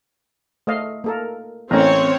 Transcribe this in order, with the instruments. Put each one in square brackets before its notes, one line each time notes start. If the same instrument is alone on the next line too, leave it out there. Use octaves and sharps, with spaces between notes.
[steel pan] A3 D#5 F5
A#3 A4 A#4
[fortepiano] A1 C#4 [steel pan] A3 A#3 A#5 [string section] C4 C#5